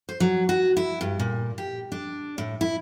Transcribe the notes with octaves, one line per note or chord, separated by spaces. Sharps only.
C5
F#3
F#4
E4
G2
A#2
G4
D4
A2
E4